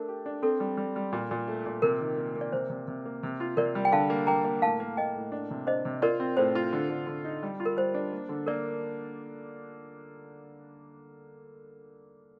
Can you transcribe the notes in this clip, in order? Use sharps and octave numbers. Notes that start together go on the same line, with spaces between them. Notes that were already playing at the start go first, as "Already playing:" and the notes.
Already playing: A3 D4 A#4
G4
D4
C4 A4
G3
G3
G3
A#2
A#2
A3
A#2
C3 A#4
D#3
A#3
A#3
D5
C3 C5
C3
C3
A#3
C3
F4
C3 A#4 D5
G3
G5
D3 F5 A5
A#3
A#3 G5 A#5
A#3
A2 F5 A5
A#3
A#3 D#5 G5
A2
D4
C3
D4 C5 D#5
C3
F4 A#4 D5
C4
A2 C5
F4
D3
D3
D3
D#4
G3
F4
A#4
G3 C5
D4
A#3
D3
A#3 A#4 D5